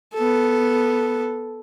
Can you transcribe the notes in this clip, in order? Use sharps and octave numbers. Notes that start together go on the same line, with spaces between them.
B3 A4